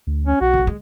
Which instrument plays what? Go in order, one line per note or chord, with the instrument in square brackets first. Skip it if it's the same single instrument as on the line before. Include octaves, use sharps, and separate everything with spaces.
[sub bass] D2
[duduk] C#4
[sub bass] B1 [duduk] F#4
[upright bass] D3 G#3
G#3